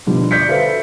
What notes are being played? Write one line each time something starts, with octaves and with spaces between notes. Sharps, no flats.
B2 D3 F3 G3
D5 G6 B6 C#7
F#4 A4 B4 C5 E5 F5